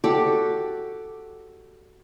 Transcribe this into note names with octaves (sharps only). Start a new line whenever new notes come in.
F#4 G4 A4 D5